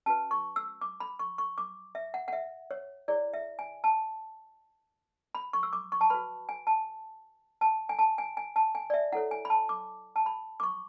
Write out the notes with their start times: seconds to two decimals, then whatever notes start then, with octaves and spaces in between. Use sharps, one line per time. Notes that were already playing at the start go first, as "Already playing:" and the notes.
0.06 C#4 F#4 B4 A5
0.31 C#6
0.56 E6
0.81 D6
1.00 B5
1.19 C#6
1.38 C#6
1.58 D6
1.95 E5
2.14 F#5
2.28 F#5
2.33 E5
2.71 C#5
3.08 E4 G#4 C#5 D5
3.34 E5
3.59 G#5
3.84 A5
5.35 B5
5.53 C#6
5.63 E6
5.73 D6
5.92 C#6
6.01 A5
6.10 F#4 B4 B5
6.49 G#5
6.67 A5
7.61 A5
7.89 G#5
7.99 A5
8.18 G#5
8.37 G#5
8.56 A5
8.75 G#5
8.90 D5
8.94 E5
9.12 E4 A4 C#5 F#5
9.31 G#5
9.45 B5
9.50 A5
9.69 D6
10.16 A5
10.26 B5
10.60 D6
10.63 C#6